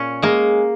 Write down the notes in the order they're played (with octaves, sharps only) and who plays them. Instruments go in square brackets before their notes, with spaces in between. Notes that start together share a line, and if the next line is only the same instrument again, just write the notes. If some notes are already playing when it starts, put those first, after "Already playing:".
Already playing: [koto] A#2 C#4
G#3 A#3